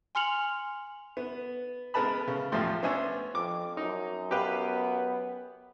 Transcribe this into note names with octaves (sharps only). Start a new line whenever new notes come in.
G#5 C6 F6 C#7 F7 F#7
B3
G#3 B3 A#4 B4 A5 B5
C#3
E2 A2 F3 A3 G4 C6
B3 C#4 D4 C5 E5 G#5
F2 D6
F#2 D#4
B3 G4 B4 F5